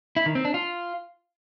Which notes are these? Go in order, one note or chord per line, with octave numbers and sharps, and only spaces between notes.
E4
D#3
C4
D4
F4